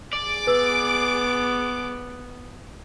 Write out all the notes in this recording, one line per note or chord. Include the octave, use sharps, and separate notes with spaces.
G#4 D5 D6
B3 B4 E6